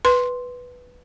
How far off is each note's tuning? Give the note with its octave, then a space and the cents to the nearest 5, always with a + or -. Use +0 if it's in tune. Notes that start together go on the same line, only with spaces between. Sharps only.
B4 +0 C6 +0